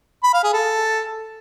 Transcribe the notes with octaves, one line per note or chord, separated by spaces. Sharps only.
B5
F5
G#4
A4